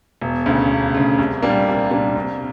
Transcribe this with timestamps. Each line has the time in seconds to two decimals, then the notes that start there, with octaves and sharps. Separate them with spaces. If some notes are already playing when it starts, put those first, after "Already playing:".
0.22 E1
0.46 D2 C#3
0.70 E1
0.95 D2 C#3
1.19 C2
1.43 A#2 G3 A#3 D4
1.67 C2
1.91 A#2 G3 A#3 D4
2.16 C2